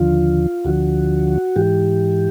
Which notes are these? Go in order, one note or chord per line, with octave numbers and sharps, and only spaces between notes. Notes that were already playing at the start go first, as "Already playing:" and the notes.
Already playing: D#2 D3 F3 F4
D2 D3 F3 F#4
G#2 E3 G4